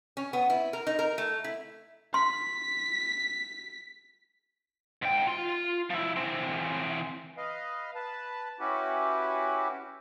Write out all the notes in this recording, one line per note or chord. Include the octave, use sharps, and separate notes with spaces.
C#4
B3
E4
A#4
D#4
A#4
A3
E4
C6 B6
G#2 G5
F4 C6
F3 E4
E3 C4
B4 D#5 F5
B4 A5
C#4 E4 F#4 G4 B4